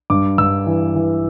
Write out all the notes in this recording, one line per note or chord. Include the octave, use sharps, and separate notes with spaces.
G2 D6
G2 E6
E3
E3